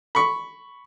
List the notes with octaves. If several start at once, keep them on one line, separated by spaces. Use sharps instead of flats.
B5 C#6